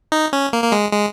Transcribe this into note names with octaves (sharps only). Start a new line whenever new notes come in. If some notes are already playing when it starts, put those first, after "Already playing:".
D#4
C#4
A#3
A#3
G#3
G#3